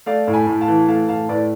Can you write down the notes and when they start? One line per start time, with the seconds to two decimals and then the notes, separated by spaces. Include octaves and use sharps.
0.06 A3 D5 F5
0.27 A2
0.33 G#5 B5
0.47 A2
0.61 F5 A5
0.68 E3
0.88 A3 F5 A5
1.08 A2 F5 A5
1.29 A2 B4 D5